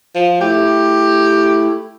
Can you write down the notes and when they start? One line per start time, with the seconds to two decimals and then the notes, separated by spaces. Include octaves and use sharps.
0.15 F3
0.41 A3 E4 G4